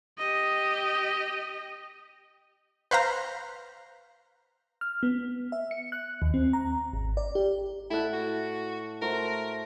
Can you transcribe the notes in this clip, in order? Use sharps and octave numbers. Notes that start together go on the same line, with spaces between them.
G4 D#5
B4 C5 F5 A#5
F6
B3
E5
C#7
F#6
D#2
C4
A#5
G#1
D5
G4
A2 E4 A4 F#5
F#4
A3 F#4 A#4 C5